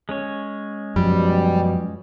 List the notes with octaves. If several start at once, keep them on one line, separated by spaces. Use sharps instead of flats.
G#3 C#4 C#5
F#2 B2 F3 G3